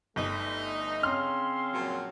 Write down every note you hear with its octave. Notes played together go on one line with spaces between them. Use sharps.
G1 A3 D#4
C#3 C4 C#4 C6 F6
A#2 F3 F#3